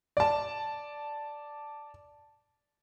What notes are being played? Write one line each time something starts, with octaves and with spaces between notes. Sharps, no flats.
D5 A5